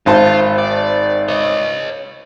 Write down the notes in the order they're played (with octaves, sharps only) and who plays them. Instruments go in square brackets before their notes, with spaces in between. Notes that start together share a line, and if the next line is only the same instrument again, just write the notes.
[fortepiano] G#1 C5 A5 [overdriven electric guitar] F4
[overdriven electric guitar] D5
C#5 D#5